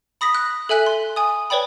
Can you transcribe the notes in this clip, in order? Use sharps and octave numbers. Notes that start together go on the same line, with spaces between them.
B5 D#6 A#6 B6
F#6
A4 E5 G#5 F#6 B6
C6
G#5 D#6
B4 C#5 D5 G5 B5